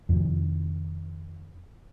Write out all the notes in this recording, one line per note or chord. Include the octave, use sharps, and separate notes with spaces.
F2 C3 D#3 F3